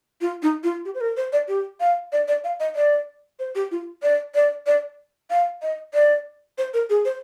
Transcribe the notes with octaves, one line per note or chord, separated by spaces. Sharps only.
F4
D#4
F4
G4
C5
A#4
C5
D5
G4
F5
D5
D5
F5
D#5
D5
C5
G4
F4
D5
D5
D5
F5
D#5
D5
C5
A#4
G#4
C5